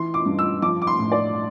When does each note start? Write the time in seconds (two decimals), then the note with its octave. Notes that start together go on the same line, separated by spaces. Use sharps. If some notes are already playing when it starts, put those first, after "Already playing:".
Already playing: E3 C6
0.14 D6
0.26 G2
0.39 E6
0.62 F3 D6
0.82 D6
0.87 C6
0.99 A2
1.12 D5